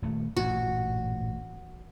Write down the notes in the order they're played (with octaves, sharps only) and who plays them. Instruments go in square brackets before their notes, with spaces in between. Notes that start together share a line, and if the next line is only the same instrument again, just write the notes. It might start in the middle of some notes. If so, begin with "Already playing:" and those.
[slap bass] D#1 A3
[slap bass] A1 G2 A#2 [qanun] F#4